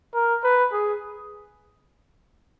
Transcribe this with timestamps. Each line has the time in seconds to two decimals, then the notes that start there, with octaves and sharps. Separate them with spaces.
0.14 A#4
0.44 B4
0.72 G#4